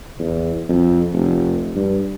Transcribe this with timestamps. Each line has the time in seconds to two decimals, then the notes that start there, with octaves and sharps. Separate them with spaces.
0.19 E2
0.69 F2
1.13 F1
1.75 G2